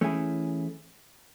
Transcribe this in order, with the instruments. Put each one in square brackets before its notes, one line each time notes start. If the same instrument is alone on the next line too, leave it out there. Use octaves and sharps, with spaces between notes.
[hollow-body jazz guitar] E3 A3 C#4 E4 G#4